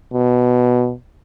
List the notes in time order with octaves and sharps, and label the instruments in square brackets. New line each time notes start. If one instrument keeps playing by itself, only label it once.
[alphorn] B2